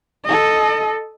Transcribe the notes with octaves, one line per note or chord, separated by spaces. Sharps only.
A4 D#5